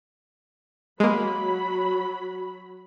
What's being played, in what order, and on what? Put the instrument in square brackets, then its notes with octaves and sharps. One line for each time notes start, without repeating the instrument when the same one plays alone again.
[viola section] F#3 B5 [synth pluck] G#3 A#3